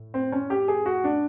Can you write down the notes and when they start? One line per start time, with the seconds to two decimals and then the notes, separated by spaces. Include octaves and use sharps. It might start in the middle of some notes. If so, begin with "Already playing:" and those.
Already playing: A2
0.14 C4
0.32 C#4
0.50 G4
0.68 G#4
0.86 F#4
1.04 D4